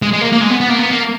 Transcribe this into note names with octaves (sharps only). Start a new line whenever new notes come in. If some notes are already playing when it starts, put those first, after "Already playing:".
G#3
G#3
A#3
A#3
G#3
B3
B3
A#3
B3
A#3